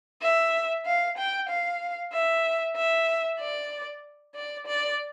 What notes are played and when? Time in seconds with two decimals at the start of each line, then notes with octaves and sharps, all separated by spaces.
0.22 E5
0.86 F5
1.17 G5
1.49 F5
2.13 E5
2.76 E5
3.40 D5
4.35 D5
4.67 D5